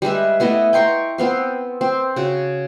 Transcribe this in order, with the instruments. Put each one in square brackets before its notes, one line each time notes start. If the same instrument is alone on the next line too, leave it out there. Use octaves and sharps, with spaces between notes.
[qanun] G3 G#3 B4 E5
A3 B3 E4 D#5
G5 A#5 C6 C#6
B3 C4 F5
C4
C#3 F#4